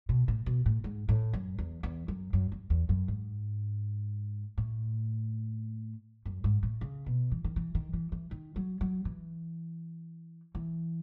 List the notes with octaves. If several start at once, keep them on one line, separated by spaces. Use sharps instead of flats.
B2
A2
B2
A2
G#2
A2
F#2
E2
E2
F#2
F#2
F#2
E2
F#2
G#2
A2
F#2
G#2
A2
C#3
B2
E3
D#3
E3
D#3
E3
E3
D#3
F#3
F#3
E3
E3